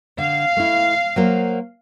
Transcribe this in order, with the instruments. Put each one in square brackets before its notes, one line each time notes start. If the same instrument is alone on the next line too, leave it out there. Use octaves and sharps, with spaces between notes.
[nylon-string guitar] D3 [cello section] F5
[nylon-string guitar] A3 E4
F#3 A#3 C5